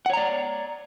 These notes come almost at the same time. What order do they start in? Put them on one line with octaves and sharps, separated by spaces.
F#5 C#5 A#5 D5